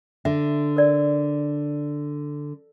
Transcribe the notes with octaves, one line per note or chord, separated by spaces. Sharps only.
D3 E5
A#4 D5